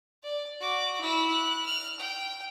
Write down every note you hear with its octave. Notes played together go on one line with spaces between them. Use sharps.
D5
F#4 D6
E4
F#6
F6
G5